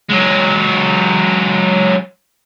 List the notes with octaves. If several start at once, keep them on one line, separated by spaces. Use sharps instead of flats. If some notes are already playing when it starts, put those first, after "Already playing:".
F#3 G#3